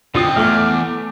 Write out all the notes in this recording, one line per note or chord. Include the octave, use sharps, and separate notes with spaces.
G#2 D3 C4 F4 D#6
E2 A3 D6 F6